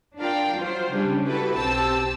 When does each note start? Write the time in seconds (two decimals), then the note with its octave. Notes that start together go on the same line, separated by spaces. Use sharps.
0.18 D4 F4 A#4 D5 F5 G5
0.55 F#3 F4 C5
0.92 C#3 G3 C#4 D4
1.26 E4 F#4 G4 A4 B4
1.55 B1 C4 G4 A5 E6